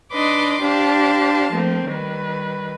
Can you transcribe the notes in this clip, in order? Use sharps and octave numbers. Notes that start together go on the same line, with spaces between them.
D4 D#4 B4 D#5 C6 D6
D4 G4 C5 F5 A5
F3 A3 A#3 C4
D#3 G3 B4